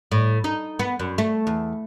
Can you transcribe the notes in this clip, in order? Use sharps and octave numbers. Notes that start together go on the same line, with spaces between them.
A2
D#4
B3
F#2
A3
E2